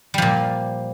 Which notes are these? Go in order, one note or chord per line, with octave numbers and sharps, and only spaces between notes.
A#2 F3 G3